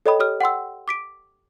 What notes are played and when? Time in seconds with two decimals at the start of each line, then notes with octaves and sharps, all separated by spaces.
0.06 A4 C#5 D#5 G5 B5 D#6
0.19 G4 C#5 D#6 F6
0.41 F#5 G5 C6 E6
0.88 D6 B6 D7